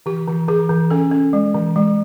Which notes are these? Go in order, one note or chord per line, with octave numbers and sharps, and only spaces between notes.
E3 G4
E3
E3 G#4
E3
C#4 A4
C#4
G#3
E3
G#3